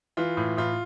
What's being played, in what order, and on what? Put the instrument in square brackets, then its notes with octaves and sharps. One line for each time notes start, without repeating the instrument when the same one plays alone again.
[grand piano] E3 F4
A2
A2 F4